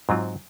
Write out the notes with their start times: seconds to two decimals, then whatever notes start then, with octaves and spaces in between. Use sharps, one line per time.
0.09 G#2 F#3 C4 F4